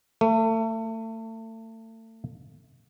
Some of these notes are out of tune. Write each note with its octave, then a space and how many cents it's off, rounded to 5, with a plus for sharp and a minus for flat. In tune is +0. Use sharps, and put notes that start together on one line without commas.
A3 +30